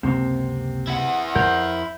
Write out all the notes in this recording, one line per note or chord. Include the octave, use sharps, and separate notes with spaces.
C#2 F#2 C3 A#3 C4
E4 F#5
F2 A#4 C5 G6